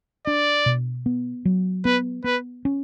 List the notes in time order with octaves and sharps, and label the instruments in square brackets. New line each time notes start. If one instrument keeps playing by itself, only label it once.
[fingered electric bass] D4 [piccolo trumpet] D5
[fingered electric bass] B2
B3
F#3
[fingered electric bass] B3 [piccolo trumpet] B4
[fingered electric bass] B3 [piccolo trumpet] B4
[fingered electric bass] C#4